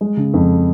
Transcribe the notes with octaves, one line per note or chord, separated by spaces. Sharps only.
G#3
C#3
F2